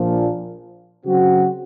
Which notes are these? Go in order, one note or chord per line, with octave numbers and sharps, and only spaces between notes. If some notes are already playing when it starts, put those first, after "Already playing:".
Already playing: A#1 A#2 F3
C#3 F#3 C4 F#4